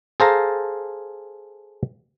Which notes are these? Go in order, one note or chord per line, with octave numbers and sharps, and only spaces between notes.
G#4 A4 C5 F5 A5 A#5